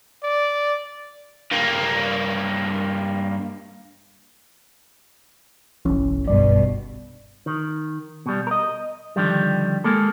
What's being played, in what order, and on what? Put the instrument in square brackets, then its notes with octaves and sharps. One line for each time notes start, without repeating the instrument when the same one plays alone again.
[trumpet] D5
[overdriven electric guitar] G2 A#3
[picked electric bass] F#1 B1 [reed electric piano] E3 C#4
[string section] G2 B2 [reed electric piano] D5
[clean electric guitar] D#3
B2 G3
A#4 D#5
D3 D#3 F3 G3
G#3 A#3 A4